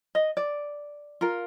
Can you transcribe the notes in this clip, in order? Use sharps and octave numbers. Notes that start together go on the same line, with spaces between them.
D#5
D5
F4 A#4